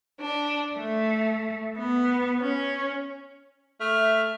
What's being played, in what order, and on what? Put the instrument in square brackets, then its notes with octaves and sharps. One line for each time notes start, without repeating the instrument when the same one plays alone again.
[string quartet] D4
A3
B3
C#4
[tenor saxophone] A3 [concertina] E5 F6